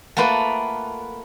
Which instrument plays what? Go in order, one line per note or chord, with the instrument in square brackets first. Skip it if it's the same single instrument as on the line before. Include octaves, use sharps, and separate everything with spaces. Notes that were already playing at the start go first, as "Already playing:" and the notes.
[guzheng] A3 A#3 F4 [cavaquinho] B4 F#5 A5